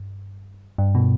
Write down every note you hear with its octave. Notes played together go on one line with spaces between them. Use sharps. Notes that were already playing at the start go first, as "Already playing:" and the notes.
Already playing: G2
G2
B2